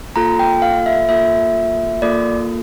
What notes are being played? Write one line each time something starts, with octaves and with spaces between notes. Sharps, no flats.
A#3 F4 A4 A#5
G5
F5
E5
A#3 F4 A4 E5
A#3 F4 A4 D5